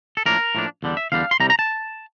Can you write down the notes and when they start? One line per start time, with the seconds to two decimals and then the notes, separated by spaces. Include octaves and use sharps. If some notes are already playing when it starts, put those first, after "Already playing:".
0.17 A4
0.26 A2 F3 A#3 D4 A#4
0.55 A2 F3 A#3 D4
0.83 E2 D3 G3 D4
0.97 E5
1.12 E2 D3 G3 D4 F5
1.31 C6
1.40 C2 C3 G3 A#5
1.50 A#5
1.59 A5